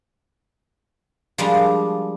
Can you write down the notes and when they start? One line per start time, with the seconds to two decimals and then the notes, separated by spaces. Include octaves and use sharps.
1.38 F3 G3 G#3 A#3 D4